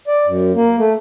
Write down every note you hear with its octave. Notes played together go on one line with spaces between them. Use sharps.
D5
F#2
A#3
A3